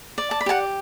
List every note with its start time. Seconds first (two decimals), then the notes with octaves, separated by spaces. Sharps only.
0.18 D5
0.31 A5
0.41 B5
0.46 G4 F#5 A5